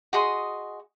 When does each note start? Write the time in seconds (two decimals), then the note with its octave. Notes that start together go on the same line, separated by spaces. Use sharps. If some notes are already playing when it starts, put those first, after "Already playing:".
0.13 F#4 G#4 D#5 C6